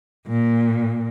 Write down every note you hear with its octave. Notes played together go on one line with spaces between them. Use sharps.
A#2